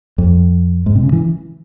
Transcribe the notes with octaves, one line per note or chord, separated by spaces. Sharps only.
F2
G#2
C3
C#3
E3